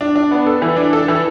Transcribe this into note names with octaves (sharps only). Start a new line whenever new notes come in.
D4
D4
B3
A4
E3
D4
A4
E3